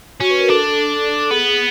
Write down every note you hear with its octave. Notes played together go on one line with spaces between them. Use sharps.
C#4 F#4
B4
A#4
D4 A4
B3 G#4